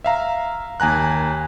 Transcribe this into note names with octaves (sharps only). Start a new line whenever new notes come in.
E5 F5 A#5
D#2 G#5 A#5 F#6